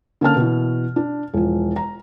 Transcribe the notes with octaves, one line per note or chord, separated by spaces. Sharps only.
D3 A#3 C#4 A5 F6
B2 E3
D4
E1 F3
A#5